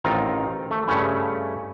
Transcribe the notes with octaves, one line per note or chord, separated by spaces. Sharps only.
A1 D#3 C4 D#4 F4 A#5
A3
G2 C#3 A3 C#4 E4